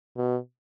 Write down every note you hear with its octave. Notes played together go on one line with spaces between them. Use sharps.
B2